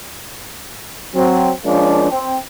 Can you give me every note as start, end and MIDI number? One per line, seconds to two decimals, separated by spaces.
1.15 1.50 54
1.15 1.50 60
1.64 2.08 53
1.64 2.08 56
1.64 2.08 58
1.64 2.08 61
1.64 2.08 62
2.11 2.37 60